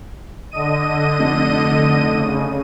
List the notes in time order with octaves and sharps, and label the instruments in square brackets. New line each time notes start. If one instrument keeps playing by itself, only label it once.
[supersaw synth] D3 D#5 D#7
[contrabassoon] F1
[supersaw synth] C#3